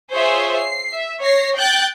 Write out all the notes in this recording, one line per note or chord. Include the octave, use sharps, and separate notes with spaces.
F4 G#4 C5 C#5 E5 C6
C7
E5
C#5 A#6 C7
G5 F#6 G6 A6